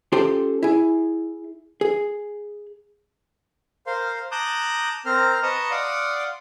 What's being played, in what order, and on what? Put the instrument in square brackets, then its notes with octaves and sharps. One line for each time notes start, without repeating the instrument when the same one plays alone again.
[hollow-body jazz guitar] C#4 F4 G4 A4 C5 C6
E4 G#4
G#4
[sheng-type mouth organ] A#4 C5 F5 C6
A5 A#5 D6 D#6 F#6 G6
C4 A#4 C5 A#5 F6
B4 D#5 A5 A#5 C#6 D#6
D5 F5 F#5 C6 D#6